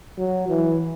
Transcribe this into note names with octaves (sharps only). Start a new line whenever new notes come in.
F#3
E3